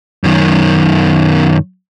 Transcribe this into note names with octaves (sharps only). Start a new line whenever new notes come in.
F#2 D#3